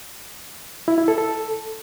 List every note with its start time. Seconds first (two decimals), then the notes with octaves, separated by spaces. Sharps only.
0.88 E4
0.98 E4
1.08 A4
1.18 A4